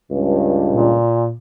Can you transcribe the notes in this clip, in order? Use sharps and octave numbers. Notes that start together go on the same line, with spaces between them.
C#2 G2
A#2